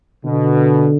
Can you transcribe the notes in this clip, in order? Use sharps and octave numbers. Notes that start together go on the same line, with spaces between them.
B2 D3